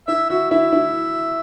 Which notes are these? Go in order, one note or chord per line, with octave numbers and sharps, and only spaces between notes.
E4 E5
F#4 E5
E4 E5
E4